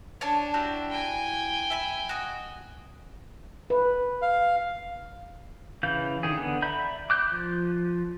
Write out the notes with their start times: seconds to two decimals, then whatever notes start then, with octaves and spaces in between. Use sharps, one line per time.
0.21 D4 C#5 G#5 A5
0.54 E4 F#4 G4
0.91 G5 G#5
1.70 E5 B5
2.09 F#4 D#5
3.70 B4
4.22 F5
5.83 C#3 E3 F5 G6
6.23 D3 D#3 G#4
6.38 D3 B3
6.62 D5 E5 A#5 B5 G6
7.10 D6 F#6 G6
7.32 F3